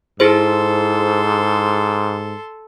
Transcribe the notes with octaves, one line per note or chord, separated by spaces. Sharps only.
G#2 E4 G#4 A4 C5 C6